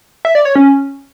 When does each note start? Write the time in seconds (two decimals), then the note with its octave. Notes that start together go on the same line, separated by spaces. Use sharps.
0.25 E5
0.35 D5
0.45 C#5
0.55 C#4